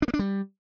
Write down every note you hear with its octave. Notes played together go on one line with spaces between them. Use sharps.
D4
A#3
D4
G3